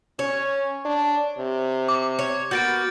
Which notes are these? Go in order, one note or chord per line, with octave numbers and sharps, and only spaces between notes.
C#4 C#5
D4
C3
D6
C#5
A#3 B3 F#4 G6 A6 D7